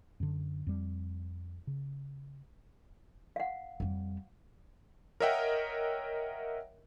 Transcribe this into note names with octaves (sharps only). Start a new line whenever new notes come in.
F#2 D3
F2 G3
C#3
F5 F#5
F2 G3
A#4 C#5 D#5 E5 F#5 G5